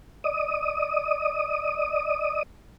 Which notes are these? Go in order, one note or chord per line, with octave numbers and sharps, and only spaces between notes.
D5 D#5 D#6